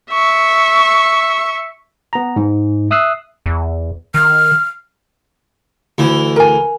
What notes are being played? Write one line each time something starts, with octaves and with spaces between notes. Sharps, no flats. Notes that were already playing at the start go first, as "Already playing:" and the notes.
E5 C#6
B3 A#5
G#2
E5 D#6 E6 F#6 C7
E2
D#3 F6
D2 E3
A#4 G#5